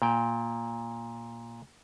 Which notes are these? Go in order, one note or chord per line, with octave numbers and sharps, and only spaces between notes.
A#2 G5